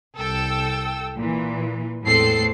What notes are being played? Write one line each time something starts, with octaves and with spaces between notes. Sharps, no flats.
C2 A4 G5 E6
A#2 E3
E2 A2 G#3 C4 A4 C7